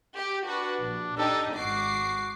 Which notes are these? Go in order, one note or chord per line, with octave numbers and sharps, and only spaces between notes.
G4
D4 F#4 B4
A#1
D4 D#4 G4 A4
G#1 F#4 D6 C7